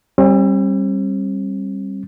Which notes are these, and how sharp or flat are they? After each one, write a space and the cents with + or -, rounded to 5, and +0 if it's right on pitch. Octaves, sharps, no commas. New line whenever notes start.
G3 +0 C4 +45